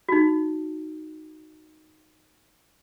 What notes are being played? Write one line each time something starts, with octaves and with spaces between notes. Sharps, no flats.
D#4 F#4